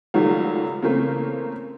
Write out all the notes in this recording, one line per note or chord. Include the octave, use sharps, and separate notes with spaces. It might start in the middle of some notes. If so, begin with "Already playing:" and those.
C#2 D#3 F#3 G3 A3
C#3 E3 A3 A#3 C4